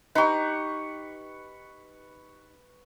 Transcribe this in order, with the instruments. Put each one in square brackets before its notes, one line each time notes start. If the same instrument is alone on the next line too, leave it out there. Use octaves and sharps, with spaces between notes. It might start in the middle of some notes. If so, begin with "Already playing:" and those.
[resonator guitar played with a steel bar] D#4 G4 [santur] B4 C#6